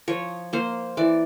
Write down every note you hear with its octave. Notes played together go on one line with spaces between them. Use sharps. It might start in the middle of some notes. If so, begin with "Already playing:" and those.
F3 C#5
A#3 C5
E3 D5